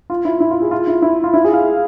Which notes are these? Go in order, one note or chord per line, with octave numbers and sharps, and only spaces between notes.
F4
E4
E4
F4
G#4
F4
E4
E4
F4
E4
G#4
F5